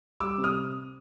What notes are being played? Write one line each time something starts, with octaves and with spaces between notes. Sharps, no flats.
G3 D6 E6
C3
D#6 F6